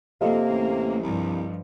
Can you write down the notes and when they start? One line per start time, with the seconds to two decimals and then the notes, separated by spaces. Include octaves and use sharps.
0.21 F2 C3 A#3 A4 D#5 F5
0.49 A1
1.03 C2 G2 F3